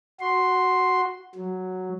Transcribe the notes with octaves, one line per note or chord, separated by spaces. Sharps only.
F#4 C6
F#3